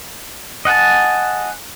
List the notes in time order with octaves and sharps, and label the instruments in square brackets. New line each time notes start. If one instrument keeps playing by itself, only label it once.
[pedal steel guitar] D#5 F#5 G#5 A5